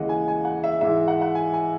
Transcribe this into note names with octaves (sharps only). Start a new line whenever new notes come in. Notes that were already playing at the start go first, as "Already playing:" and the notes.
Already playing: D#2 C#3 E3 G#3 D#5 F#5
G#5
G#5
F#5
E5
G#2 E3 G#3 E5
F#5
F#5
G#5
G#5